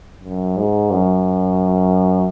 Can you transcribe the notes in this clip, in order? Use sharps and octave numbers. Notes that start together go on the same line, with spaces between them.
F#2
G#2
F#2